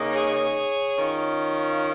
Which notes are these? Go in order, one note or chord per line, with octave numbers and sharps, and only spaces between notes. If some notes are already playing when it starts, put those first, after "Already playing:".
Already playing: C#3 A#3 D#4
G#4 C#5
D#3 C#4 F4